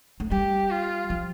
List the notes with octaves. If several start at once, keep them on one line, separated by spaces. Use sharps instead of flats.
A3
G3 G4
F4
F3